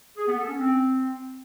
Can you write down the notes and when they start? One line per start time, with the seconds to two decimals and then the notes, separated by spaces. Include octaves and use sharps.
0.17 G#4
0.28 B3
0.38 A4
0.49 C#4
0.59 C4